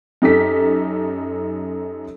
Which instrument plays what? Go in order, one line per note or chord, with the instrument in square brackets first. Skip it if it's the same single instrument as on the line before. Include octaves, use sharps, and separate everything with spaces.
[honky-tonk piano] F#2 D#4 G4 A4 B6